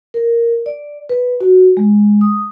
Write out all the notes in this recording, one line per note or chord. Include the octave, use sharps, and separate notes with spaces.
A#4
D5
B4
F#4
G#3
D#6